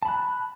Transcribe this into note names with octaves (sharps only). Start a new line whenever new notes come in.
A5 B5 F#6